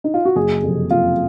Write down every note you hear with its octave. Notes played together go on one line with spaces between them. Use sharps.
D#4
F4
F#4
F#1 G#4
F2 C3
F#1 F4